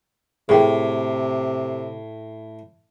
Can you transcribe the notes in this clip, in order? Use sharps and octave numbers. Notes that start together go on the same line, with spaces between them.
A2 C3 G#4 A#4 G5